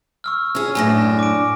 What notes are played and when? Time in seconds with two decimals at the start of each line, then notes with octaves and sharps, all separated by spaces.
0.24 C#6 E6 F6
0.55 C#4 G#4
0.75 F#2 A2 D4 G#5 A#6
1.19 D6 D7